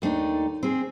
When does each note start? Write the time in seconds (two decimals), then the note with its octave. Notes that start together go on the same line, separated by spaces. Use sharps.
0.02 D#2 A3 D4 D#4
0.63 C4 G#4